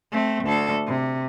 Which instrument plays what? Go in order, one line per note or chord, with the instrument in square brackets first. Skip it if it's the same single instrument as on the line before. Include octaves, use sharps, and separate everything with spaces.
[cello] A3 C4
D2 A4
C3